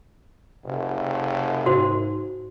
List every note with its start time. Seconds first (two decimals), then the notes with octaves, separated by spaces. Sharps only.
0.65 F#1 C3
1.66 G#2 F#4 C5